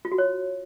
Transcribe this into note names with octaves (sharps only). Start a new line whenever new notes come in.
F4
F#4
C#5